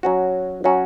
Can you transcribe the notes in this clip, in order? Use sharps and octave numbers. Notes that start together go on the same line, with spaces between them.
F#3 C#4 F#4
F#3 C#4 F#4